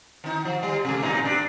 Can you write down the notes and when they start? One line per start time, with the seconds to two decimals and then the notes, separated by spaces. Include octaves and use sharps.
0.24 D#3 D#4
0.45 F3
0.63 G3
0.85 C3 A3
1.02 A2 G3 D#4
1.23 G3 D4